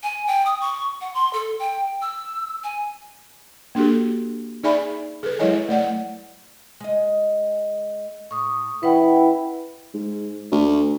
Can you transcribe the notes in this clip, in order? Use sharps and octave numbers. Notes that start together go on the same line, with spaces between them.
G#5
G5
D#6
C#6
F#5
C6
A4
G5
E6
G#5
A#3 D4 F#4 G4 A4
D#4 G#4 D5 E5 G#5 B5
G#4 A4 B4
F#3 G#3 E4 C#5 D#5 G#5
A3 D5 F#5
G#3 D#5
A2 C#6 D#6
E3 C#4 E4 B4 F#5 G5
G#2
D2